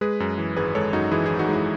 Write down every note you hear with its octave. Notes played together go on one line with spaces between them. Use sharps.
G#3 G#4 B4
F#2
E3
G#1 G#4 B4
G#3 A4 C#5
F#2 D#4 F#4
E3 E4 G#4
G#1 E4 G#4
D#4 F#4
G#3 E4